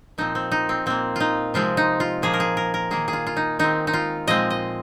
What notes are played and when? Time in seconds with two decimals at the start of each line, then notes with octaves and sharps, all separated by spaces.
0.18 A#2 F3 C4 D#4
0.35 C4
0.52 D#4
0.69 C4
0.86 A#2 A#3 C4
1.16 D#4 F4
1.54 C3 F3 G#3 C4 F4
1.77 D#4
2.00 F4
2.22 A#2 F3 A#3 G#4
2.34 A#4
2.40 G#4
2.57 A#4
2.74 A#4
2.91 D#3 A#3 G#4
3.08 G#4
3.13 F4
3.27 F4
3.37 D#4
3.59 D#3 G#3 C4 D#4
3.87 D#4
3.93 F4
4.27 A#2 F3 G#3 C4 D#5
4.50 D#5